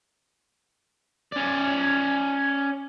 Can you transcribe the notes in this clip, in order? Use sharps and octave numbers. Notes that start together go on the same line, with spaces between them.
C#4 D5